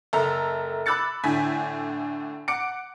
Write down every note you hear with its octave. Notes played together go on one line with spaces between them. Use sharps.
F#1 A4 E5 A#5
B5 D6 E6 F#6 A6 C#7
A2 D3 G#5 B6
F#5 D6 C#7 D7